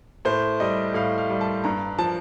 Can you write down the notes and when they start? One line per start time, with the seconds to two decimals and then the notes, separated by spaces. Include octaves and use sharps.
0.25 A2 C5
0.60 G3 D#5
0.94 A2 F5
1.18 F5
1.29 G3
1.41 A5
1.64 G2 A#5
1.99 F3 A5